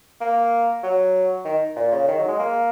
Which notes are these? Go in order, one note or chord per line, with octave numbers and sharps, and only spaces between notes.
A#3
F#3
D#3
A#2
C#3
D#3
F#3
G#3
A#3